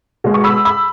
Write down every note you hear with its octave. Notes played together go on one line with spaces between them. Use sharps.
B2 G#3
C#6
B5 E6
B5 E6